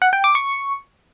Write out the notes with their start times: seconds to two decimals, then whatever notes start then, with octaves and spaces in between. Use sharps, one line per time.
0.02 F#5
0.13 G5
0.24 D6
0.35 C#6